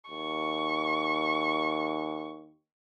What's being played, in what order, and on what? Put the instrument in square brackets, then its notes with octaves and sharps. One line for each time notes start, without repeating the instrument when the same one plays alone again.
[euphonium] D#2 [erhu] C#6